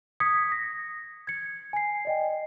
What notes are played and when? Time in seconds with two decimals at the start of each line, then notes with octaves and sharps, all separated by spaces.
0.20 D#6 G#6 B6 C#7
0.52 A#6
1.27 G#6 C#7
1.73 G#5 C7
2.05 D5 D#5 G5